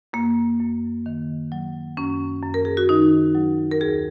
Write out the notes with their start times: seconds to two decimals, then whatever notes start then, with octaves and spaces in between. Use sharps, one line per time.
0.13 F#2 A#3
0.60 F#2
1.06 D#3
1.52 F#3
1.97 F#2 C#4
2.43 F#2
2.54 A#4
2.65 G#4
2.77 F#4
2.89 D#3 D#4
3.35 F#3
3.71 A#4
3.81 D#2 G#4